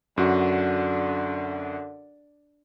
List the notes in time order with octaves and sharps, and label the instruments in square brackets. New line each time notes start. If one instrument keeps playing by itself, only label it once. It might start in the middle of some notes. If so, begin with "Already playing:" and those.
[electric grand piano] F#2 F#4 [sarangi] D3